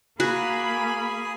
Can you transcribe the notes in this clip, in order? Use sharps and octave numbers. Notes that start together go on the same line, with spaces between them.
A#3 F#4 G#4 G#5 B5